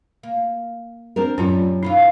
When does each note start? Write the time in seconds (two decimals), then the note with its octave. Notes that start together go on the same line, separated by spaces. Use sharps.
0.23 A#3
1.16 C4 D4 A#4
1.38 F#2 A2 G3 C#4 F4
1.83 D#3 E3 D#4 F4